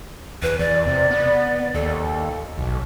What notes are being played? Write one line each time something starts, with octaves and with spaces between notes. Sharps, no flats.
E2 B4
E2 D5
C3
B3
D#2 A4
B1